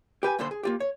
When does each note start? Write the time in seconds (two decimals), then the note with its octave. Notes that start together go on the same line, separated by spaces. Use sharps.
0.23 G4 B4 G#5
0.39 G2 A#2 D3 A4 C5 C6
0.51 G#4
0.63 A#3 F4 G4
0.80 C#5